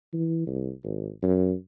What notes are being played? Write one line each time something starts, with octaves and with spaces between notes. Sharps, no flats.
E3
C2
G#1
F#2